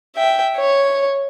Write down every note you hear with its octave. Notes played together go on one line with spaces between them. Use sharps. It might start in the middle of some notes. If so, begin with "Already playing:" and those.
E5 G5
C#5